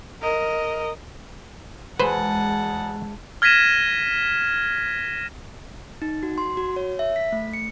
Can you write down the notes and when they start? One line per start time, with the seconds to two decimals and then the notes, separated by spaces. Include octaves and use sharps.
0.21 A#4 D#5
2.00 E1 G#3 G#4 B4 C5 F#5 A5
3.42 F6 G#6 A#6 B6 D#7 E7
6.02 D#4
6.23 F#4
6.38 C6
6.57 F#4
6.76 C#5
6.99 E5
7.16 B6
7.32 A3
7.54 C#7